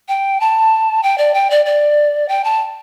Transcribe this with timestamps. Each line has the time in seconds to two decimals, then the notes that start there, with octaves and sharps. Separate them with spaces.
0.08 G5
0.40 A5
1.03 G5
1.18 D5
1.34 G5
1.50 D5
1.66 D5
2.29 G5
2.44 A5